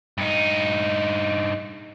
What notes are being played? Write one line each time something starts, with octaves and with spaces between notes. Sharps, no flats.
G2 D#4